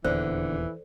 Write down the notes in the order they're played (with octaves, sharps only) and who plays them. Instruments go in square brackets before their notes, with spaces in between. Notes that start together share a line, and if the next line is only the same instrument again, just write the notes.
[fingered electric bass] D#1 E2 [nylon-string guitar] D3 [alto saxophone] E3 [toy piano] C5